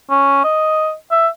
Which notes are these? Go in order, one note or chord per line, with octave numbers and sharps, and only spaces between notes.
C#4
D#5
E5